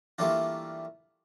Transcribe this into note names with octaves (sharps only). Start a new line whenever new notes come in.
E3 G3 A3 A#3 D4 F4